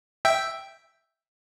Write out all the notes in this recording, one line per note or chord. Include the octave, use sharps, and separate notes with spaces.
E5 G5